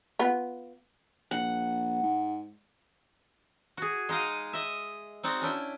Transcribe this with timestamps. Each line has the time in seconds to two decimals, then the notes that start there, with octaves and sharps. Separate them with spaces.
0.19 B3 F4
1.31 A#1 F#5
2.02 G#2
3.77 F#4 G#4
4.09 G#3 D#4 D#5 F5
4.53 D#5 E5
5.23 C4 D#4 F#4 D5
5.41 C#4 D4 E4 G5